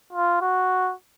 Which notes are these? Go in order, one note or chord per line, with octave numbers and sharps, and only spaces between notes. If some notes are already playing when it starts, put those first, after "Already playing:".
F4
F#4